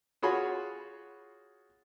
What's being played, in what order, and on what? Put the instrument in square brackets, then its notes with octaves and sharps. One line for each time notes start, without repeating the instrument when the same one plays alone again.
[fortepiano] F4 F#4 G#4 C#5 B5 C6